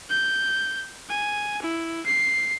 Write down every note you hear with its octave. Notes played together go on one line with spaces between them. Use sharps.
G6
G#5
E4
C7